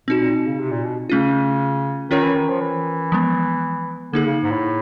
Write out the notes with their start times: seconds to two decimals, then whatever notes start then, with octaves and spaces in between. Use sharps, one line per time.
0.08 B2 C4 D#4 F#4
0.21 A#2
0.34 B2
0.46 C#3
0.59 C3
0.71 A#2
0.85 B2
1.10 C#3 A3 C#4 F4
2.11 D#3 C#4 F4 A#4 C#5
2.23 E3
2.36 D#3
2.49 F3
2.61 E3
3.12 F3 G#3 B3
4.13 D3 A#3 D#4 G#4
4.26 C#3
4.43 G#2
4.51 A2